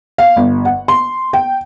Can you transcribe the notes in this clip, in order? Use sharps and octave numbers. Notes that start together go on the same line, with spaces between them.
F5
G1
F#5
C6
G5